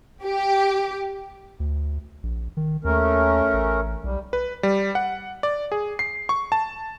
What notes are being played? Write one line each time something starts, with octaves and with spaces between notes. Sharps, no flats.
G4
D2
A#1
D#3
D#2 A3 C#4 A#4
A1
B1 G3
B4
G3
F#5
D5
G#4
C7
C#6
A5